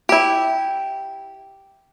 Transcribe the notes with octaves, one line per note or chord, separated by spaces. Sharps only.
E4 G4